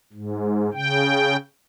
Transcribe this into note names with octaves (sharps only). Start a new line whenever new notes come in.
G#2
C#3 G5